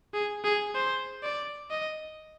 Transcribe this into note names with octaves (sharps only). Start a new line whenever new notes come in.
G#4
G#4
C5
D5
D#5